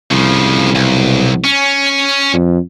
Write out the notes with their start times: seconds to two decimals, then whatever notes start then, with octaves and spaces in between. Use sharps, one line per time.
0.11 C2 C#3 F3
0.75 B1
1.44 C#4
2.33 F2